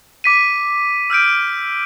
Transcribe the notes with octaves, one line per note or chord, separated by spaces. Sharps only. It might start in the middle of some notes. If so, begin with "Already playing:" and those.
D6 B6 D#7
E6 F6 G6 D7